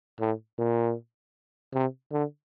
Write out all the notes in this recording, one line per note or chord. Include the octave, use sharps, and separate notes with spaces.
A2
A#2
C3
D3